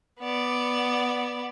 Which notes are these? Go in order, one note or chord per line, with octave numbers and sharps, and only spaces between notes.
B3 D5